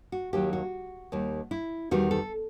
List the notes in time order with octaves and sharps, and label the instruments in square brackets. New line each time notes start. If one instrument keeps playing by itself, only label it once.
[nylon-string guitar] F#4
D#2 D#3 F#3 G4
F#4
D#2 D#3 G3
E4
E2 D#3 G3 F#4
A4